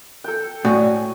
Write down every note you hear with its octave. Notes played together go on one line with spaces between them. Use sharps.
A4 G5
A2 F#4 D5 G#5